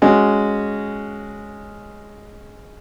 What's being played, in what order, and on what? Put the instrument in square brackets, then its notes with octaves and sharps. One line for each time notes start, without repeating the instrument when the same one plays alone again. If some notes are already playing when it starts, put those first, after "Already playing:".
[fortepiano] G#3 C#4 F#4